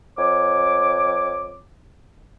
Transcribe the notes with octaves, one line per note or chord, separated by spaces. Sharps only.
F2 C#5 D6